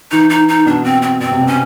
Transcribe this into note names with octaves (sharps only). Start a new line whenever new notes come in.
E3 D#4
D#4
D#4
B2 D4
C4
C4
B2 C4
C3
B2
C#4